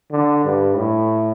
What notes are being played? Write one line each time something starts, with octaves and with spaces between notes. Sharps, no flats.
D3
G2
A2